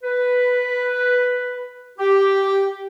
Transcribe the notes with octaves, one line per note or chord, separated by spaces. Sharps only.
B4
G4